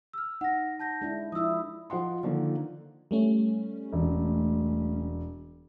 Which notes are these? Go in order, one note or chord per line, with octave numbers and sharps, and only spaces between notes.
E6 F6
D#4 F#5 A#6
A5 G6 A#6
G#3 D4 E4
F3 E4 D#6 E6
F3 D#5 F#5 C6
D3 D#3 F3 A#3 A4
G3 A3 C#4
E1